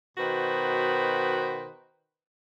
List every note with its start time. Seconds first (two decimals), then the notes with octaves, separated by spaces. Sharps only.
0.18 B2 D#3 F#4 B4 C5